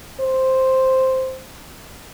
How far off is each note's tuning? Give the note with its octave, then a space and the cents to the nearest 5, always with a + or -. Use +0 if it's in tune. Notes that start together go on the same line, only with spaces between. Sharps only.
C5 +0